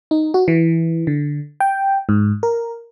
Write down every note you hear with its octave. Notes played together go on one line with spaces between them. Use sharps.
D#4
F#4
E3
D3
G5
G#2
A#4